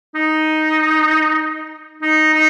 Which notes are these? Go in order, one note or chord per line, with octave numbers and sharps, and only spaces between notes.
D#4
D#4
D#4